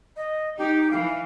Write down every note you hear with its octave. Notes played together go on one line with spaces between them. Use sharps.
D#5
D#4 G4
E3 F5